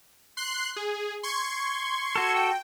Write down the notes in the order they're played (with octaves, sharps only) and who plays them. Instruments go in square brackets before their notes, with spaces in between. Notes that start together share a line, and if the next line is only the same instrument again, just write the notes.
[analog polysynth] C6 F#6 C7
G#4
C6 C#6 G#6
[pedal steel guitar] F#4 A4
[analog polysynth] G5